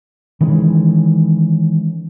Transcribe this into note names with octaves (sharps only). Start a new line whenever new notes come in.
D#3 E3 G#3 C#4